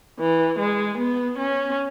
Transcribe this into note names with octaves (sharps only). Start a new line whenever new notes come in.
E3
G#3
B3
C#4